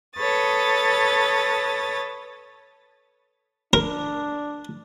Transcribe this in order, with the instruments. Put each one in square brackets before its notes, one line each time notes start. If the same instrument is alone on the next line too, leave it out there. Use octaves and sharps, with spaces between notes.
[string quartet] A4 B4 C#5 D#6 A6
[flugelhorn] D4 [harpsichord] A#4